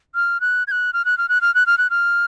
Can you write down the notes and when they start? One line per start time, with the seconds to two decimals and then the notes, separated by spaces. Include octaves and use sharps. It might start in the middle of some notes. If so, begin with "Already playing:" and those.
0.15 F6
0.41 F#6
0.67 G#6
0.71 F#6
0.93 F6
1.05 F#6
1.18 F6
1.29 F#6
1.41 F6
1.55 F#6
1.67 F6
1.78 F#6
1.90 F6